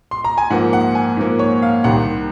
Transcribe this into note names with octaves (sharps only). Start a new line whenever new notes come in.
C6
A#5
G#5
G#2 F3 A#3 F#5
F#5
G#5
G#2 F3 A#3
C#5
F5
C2 C3 D#3 F#5